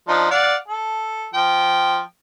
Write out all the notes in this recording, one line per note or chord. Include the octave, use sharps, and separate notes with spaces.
F3 D4 D#4
D5 F5 F#5
A4
F3 G5